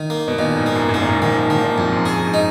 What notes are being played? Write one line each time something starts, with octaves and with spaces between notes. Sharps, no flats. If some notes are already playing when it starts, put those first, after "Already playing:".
Already playing: D#3
A#3
B2
A#2 D#3
G#2
A#3
F#2
G#2
F#2 A#3
A#2
G#2
D#3 A#3
F3
D#3 A#3
A#2
F2 G#2
F#2
F#2 G#4
G#2
D#4